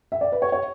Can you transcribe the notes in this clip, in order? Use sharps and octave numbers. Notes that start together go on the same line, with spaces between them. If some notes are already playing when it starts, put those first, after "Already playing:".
E5
D5
B4
C#5
C#5